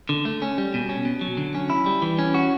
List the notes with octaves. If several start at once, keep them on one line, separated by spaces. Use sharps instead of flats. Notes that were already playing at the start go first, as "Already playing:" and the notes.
D3
A3
C#4
G3
B2
C#4
B2
F#3
D3
C#4
E4
G3
E3
C#4
F#4